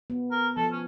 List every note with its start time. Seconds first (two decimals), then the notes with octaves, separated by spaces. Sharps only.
0.10 B3
0.31 A#4
0.57 F3 A4
0.72 C#4